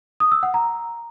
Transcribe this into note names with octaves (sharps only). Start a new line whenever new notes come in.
D#6
E6
F#5
A#5